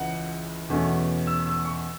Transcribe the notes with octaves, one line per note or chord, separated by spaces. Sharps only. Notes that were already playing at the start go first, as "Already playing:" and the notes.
Already playing: C#2 C#3 E3 F#5
E2 B2 A3 C#4
E6
E6
C#6